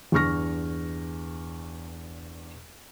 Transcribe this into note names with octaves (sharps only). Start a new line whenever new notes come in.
E2 G2 C#6 F6 A#6